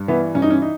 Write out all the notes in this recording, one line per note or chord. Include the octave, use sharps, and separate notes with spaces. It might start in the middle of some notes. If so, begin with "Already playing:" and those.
Already playing: G2
E3 B3
G2 C#4
D#4
C#4
D#4